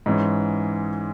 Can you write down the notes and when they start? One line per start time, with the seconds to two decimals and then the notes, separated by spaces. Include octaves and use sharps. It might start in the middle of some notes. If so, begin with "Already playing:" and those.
0.06 G#2 E3 G#3 C#4